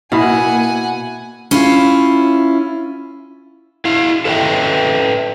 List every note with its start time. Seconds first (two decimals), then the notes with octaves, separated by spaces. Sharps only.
0.12 B2 A#3 E4 E5 F#5 G#5 B5
1.51 C#4 E4 F4
3.85 E4 F5
4.25 A4 B4 D5 E5 G5